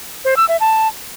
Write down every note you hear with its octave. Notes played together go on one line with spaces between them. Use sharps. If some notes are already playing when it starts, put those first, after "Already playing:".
C5
E6
E5
A5